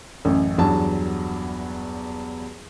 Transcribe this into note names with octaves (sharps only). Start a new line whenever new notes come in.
A1 F#2
E2 G2 F#3 A5